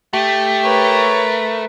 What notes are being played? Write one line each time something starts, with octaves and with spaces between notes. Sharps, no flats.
A3 G4
A#4 B4 C#5